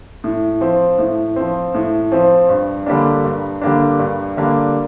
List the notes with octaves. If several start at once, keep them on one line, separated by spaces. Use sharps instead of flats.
A2
F3 C4
A2
F3 C4
A2
F3 C4
G2
D3 G3 A#3 D4
G2
D3 G3 A#3 D4
G2
D3 G3 A#3 D4